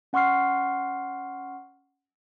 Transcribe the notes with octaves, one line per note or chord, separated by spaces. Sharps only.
C#4 F#5 C6 C#6 F6 C7